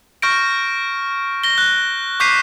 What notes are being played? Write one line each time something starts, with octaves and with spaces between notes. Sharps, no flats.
C#6 F6 G6 A#6 D7
A#6 G7
F#6
C#6 D6 G6 B6 C7 D#7